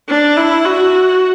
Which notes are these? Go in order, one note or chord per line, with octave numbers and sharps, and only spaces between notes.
D4
E4
F#4